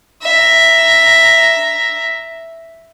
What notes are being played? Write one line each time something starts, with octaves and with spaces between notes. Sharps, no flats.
E5 A#5